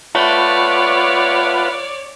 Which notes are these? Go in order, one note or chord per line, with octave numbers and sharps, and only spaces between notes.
A3 F4 B4 C#5 D5 F#5